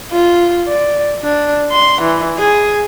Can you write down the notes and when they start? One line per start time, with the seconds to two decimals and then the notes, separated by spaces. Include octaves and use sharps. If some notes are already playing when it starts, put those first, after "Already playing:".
0.12 F4
0.67 D5
1.22 D4
1.72 C6
2.02 E3
2.37 G#4